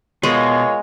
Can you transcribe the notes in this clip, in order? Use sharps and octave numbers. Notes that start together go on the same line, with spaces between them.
B2 G#3 F4 A#4 C#5